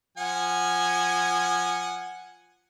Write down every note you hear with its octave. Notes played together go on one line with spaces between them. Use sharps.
F3 F#5 G#5